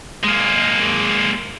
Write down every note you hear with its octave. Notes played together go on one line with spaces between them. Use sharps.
G#3 A#3